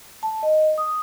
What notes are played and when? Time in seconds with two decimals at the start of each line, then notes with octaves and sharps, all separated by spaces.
0.23 A5
0.43 D#5
0.78 D#6